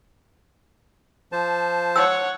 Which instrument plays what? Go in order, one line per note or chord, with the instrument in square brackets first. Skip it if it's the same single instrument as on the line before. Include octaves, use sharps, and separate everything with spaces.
[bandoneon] F3 C5 A5
[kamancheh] C#5 F#5 [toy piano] E6